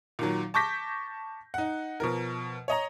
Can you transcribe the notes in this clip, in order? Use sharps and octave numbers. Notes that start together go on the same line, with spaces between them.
A#2 D#3 F#3
A5 C#6 D6 G6 A#6 B6
D#4 F#5
B2 F3 A#4
C#5 D#5 A#5